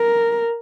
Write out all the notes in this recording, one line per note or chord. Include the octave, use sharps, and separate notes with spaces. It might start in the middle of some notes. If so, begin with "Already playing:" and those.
Already playing: A#4